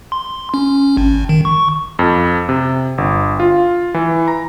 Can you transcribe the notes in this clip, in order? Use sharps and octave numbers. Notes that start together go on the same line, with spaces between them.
C6
C#4
G#1
D#3
C#6
F2
C3
G1
F4
E3
A#5